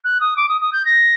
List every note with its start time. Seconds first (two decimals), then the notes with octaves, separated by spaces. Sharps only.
0.04 F#6
0.20 D#6
0.36 D6
0.48 D#6
0.61 D#6
0.72 G6
0.85 A#6